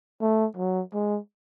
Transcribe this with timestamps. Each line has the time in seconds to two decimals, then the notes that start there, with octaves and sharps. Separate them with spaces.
0.21 A3
0.57 F#3
0.94 G#3